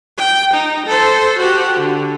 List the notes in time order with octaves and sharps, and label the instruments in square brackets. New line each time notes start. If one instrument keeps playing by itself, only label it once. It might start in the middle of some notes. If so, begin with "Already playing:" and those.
[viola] G5
D#4
A4 C5
F#4 G4
D3